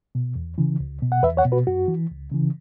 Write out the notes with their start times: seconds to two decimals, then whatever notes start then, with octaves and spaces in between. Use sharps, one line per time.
0.15 B2
0.36 E2
0.58 C#3 E3
0.80 C#2
1.02 B2
1.12 F#5
1.23 E2 B4 E5
1.37 C#5 F#5
1.45 B2
1.52 F#4 B4
1.67 F#2 F#4
1.88 E3
2.11 C#2
2.32 C#3 E3